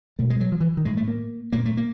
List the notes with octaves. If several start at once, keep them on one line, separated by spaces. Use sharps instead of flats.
B2 A3
G#3
F#3
F3
E3
D#3
A2 G#3
A3
A#3
A#2 A#3
A3
A#3